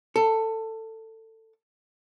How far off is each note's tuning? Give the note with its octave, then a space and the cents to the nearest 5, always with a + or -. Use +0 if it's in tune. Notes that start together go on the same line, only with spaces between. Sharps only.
A4 +20